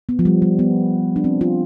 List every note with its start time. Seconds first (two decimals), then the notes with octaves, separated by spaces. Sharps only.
0.09 B3
0.19 F3
0.25 G3
0.42 G3
0.59 B3
1.16 D4
1.24 C4
1.41 F4